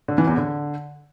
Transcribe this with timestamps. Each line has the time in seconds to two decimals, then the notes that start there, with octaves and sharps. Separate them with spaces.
0.08 D3
0.18 E3
0.28 E2
0.37 D3